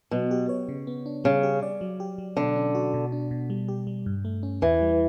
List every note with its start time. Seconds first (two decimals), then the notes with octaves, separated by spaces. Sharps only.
0.11 B2 F#3
0.31 G4
0.49 C#5
0.69 C#3
0.87 B3
1.06 D4
1.24 C#3 G3
1.43 G4
1.62 D5
1.81 F#3
2.00 G4
2.18 F#3
2.37 B2 D3
2.56 C#4
2.75 F#4
2.94 B2
3.12 D4
3.31 B2
3.50 G3
3.68 G4
3.87 G3
4.06 G2
4.25 A3
4.43 C#4
4.62 E2 E3
4.81 G3